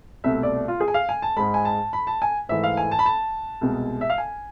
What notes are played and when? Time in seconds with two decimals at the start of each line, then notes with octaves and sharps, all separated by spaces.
0.24 C2 B2 A3 E5
0.43 D5
0.68 F4
0.80 G#4
0.88 G#5
0.94 F5
1.09 G#5
1.22 A5
1.37 G#2 G#3 B5
1.54 G#5
1.65 A5
1.93 B5
2.07 A5
2.22 G#5
2.49 G#2 E3 A3 E5
2.64 F5
2.77 G#5
2.91 A5
2.99 B5
3.06 A5
3.61 C2 B2 G#3
4.01 E5
4.10 F5
4.18 G#5